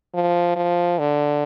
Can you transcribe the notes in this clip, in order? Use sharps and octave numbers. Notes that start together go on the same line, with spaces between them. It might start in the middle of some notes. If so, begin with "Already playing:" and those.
F3
F3
D3